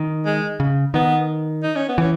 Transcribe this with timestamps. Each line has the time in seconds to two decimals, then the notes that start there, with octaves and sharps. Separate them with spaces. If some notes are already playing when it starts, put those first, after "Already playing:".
Already playing: D#3
0.26 G#3
0.60 C#3
0.94 D#3 B3
1.63 D#4
1.76 C#4
1.88 B3
1.98 E3 C#4